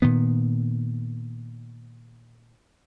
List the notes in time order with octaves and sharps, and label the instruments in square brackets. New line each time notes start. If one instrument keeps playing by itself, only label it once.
[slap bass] A#2 D#3 B3